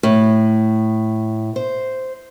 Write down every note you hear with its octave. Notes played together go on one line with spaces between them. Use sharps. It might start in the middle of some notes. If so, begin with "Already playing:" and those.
A2
C5